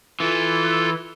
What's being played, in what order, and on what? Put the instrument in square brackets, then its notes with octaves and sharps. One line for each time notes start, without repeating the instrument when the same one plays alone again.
[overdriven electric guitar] E3 [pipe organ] F4 A4